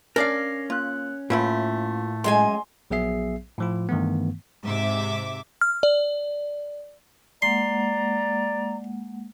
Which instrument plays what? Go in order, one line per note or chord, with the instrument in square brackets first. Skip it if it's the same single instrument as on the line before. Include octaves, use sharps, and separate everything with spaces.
[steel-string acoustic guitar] C#4 [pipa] D4 D5 [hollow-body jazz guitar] A#4 F5 [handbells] A#6 C7
[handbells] A#3 F#6 [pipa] F4
[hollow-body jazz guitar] A2 [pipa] E3 A3 E4 [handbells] A#3 F4
[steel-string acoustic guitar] F#2 G#3 G#5 [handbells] C6
[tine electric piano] A#1 F#3 B3 G#4 E5 C7
A2 F3 F4
G2 D#3 E3 A3 B3
[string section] G#2 C3 E5 D6
[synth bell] F6
D5
[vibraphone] G#3 A#3 F#5 [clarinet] D5 [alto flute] A#5 [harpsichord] C6